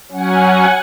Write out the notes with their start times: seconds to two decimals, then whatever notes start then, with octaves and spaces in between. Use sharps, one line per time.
0.12 F#3 C#4 F#5 G#5